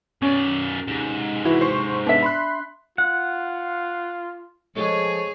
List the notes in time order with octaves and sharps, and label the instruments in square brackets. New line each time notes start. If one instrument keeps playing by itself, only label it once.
[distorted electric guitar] F#2 D5 [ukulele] C#4
[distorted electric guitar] G#2 C3
[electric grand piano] E3 E4 F#4
C5 C6 C#6
[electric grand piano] B3 [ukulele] D4 E5
[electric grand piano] B5 C6 F#6
[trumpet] F4 [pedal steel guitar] F#5
[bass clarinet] F3 [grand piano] G#3 A3 [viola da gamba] G#4 [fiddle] C#5